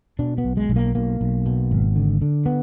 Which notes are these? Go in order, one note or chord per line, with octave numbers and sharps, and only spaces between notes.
B2 D4
B3
B1
G#3
B1
A#3
B1 A#3
B1
B2
G#1
D3
D3
B3